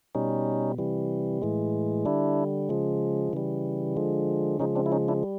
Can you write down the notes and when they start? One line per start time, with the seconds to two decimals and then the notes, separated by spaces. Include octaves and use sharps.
0.15 B2 G3 C#4 D#4
0.78 C3 E3 G3
1.42 A2 E3 G#3
2.05 D3 G3 D4 E4
2.69 C#3 F3 G#3
3.33 C#3 E3 G3
3.96 D3 F3 G#3
4.59 C#3 F3 G#3 C#4 D#4
4.75 C4 D4
4.86 E4
4.92 C#4 D#4
5.08 D4 E4
5.23 G3